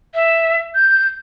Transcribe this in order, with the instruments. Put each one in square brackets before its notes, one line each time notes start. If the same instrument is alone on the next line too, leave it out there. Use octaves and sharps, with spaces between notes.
[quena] E5
G6